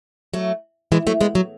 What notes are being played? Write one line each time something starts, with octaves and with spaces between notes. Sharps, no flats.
F#3 A3
E3 G#3
F#3 A3
G#3 B3
F#3